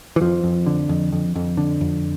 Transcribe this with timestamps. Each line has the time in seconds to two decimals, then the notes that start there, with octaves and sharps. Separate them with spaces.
0.16 E3
0.21 F2 F3
0.44 F2
0.66 D3
0.89 F2
1.12 F2
1.35 F2
1.57 D3
1.81 F2